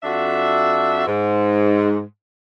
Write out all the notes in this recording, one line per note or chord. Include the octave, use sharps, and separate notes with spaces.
F2 D4 F#4 E5
G#2